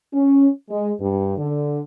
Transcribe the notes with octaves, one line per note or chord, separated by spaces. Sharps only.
C#4
G#3
G2
D3